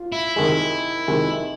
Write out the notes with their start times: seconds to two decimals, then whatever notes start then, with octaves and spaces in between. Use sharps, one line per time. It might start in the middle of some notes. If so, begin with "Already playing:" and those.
Already playing: F4
0.12 E4
0.36 C3 D#3 G#3
1.08 C3 D#3 G#3